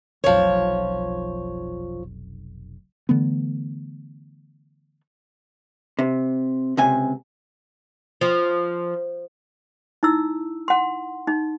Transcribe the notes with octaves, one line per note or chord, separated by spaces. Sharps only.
F1 B1 F3 C#5
D3 E3 A3 B3
C3
C#2 C3 G#5
F3
D#4 E4 E6
F#5 C6
D#4